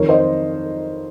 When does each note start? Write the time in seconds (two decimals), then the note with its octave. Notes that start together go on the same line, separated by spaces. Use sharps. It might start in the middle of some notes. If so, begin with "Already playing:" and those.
Already playing: F2 D#3 A#4 C#5
0.09 C5 D#5